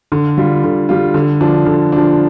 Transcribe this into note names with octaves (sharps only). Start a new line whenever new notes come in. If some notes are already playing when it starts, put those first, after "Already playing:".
D3
G3 F4
D3
G3 F4
D3
F3 D4
D3
F3 D4